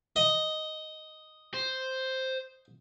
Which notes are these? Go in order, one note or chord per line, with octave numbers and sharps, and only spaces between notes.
D#5
C5